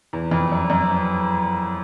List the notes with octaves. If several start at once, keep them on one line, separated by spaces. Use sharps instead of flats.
E2
F2
F#2
F#2